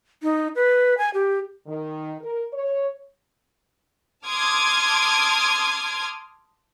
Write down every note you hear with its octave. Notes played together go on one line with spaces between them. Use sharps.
D#4
B4
G#5
G4
D#3
A#4
C#5
A5 C6 D6 D#6 F6 G#6